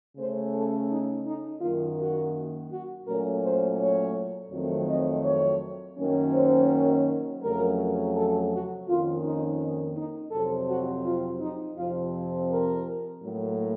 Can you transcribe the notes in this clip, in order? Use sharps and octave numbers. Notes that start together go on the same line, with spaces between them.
C#3 A3 C#4 C5
A4
D#4
D#4
F#2 D#3 A#3 F4
F#4
F#4
A#2 F#3 A3 C#4 A#4
C5
C#5
F2 D#3 F#3 A3 C4
D#5
C#5
F#2 D#3 F#3 A#3 C#4
C5
F2 C#3 F#3 A3 A#4
A4
F#4
F2 D#3 A#3 C#4 F4
D#4
D#4
F2 C3 F#3 C4 A4
F#4
F4
D#4
F2 C3 F3 C4 F4
A#4
A2 F#3 A#3